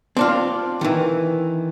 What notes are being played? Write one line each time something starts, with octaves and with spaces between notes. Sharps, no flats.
C4 D4 F4
D#3 E3